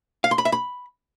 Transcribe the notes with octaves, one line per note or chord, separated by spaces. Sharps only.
F5
C6
B5
E5
B5